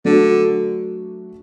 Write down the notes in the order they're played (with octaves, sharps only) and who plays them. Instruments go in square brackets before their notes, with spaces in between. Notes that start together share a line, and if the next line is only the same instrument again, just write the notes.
[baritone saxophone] D3 [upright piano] F#3 A3 D4 F#4 A4